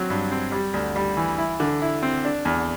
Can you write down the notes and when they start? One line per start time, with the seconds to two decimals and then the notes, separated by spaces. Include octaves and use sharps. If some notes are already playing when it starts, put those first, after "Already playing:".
Already playing: F#3 C4
0.10 G2
0.31 C4
0.52 G3
0.74 D2
0.96 G3
1.17 E3
1.38 E4
1.60 D3
1.82 E4
2.03 C4
2.25 D4
2.45 E2